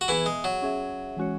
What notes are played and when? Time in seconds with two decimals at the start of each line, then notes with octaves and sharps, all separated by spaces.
0.01 F#4
0.08 E3 B3 E4 G#4 E5
0.26 G#3
0.44 F#3
0.62 C#4 G#4 E5
1.17 E3 G#3 C#4 F#4 C#5